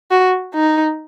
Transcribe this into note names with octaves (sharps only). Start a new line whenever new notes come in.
F#4
D#4